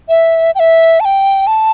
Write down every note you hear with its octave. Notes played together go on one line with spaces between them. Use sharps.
E5
G5
E5
A5
G5
A5